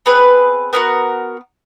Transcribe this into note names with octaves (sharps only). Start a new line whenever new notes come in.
B3 C4 G#4 B4
B3 D4 F#4 A#4